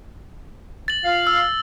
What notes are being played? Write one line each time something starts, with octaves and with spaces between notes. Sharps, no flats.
A6 F#7
F4 F5
E6